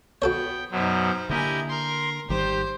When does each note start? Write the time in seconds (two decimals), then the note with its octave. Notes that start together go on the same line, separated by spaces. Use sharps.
0.22 B3 F#4 A4 C#5 G5
0.71 F#2 B2 F#3 D#4 C5
1.30 D3 A#3 E4 G4 A#4 D#5 G#5
1.69 A#4 C6
2.29 G#1 D#3 G3 G4 C5